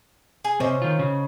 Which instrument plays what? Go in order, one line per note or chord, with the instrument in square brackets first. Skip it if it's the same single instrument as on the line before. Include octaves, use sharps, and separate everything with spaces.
[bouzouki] G#4
[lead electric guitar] C3 [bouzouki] C#4 D#4 C5
[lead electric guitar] D#3 F4
C#3